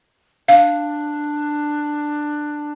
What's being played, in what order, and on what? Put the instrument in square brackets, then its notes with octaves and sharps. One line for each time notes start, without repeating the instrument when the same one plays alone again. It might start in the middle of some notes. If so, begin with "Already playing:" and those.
[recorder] D4 [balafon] F5